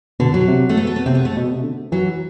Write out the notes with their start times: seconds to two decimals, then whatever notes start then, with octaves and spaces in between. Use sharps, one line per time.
0.20 B2 D3
0.34 F#3
0.48 C3
0.69 A3
0.77 B3
0.87 A3
0.96 B3
1.06 C3 C4
1.15 B3
1.25 A3
1.37 B2
1.51 C3
1.63 D3
1.92 E3 F#3